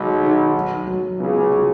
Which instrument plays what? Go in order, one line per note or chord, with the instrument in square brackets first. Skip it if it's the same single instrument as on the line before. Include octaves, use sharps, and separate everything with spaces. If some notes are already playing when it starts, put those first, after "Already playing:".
Already playing: [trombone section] B1 B2 [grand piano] D#3 G#3
[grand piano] D#3
F#3
F#3
[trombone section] C#2 C#3 [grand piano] B3
[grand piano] F#3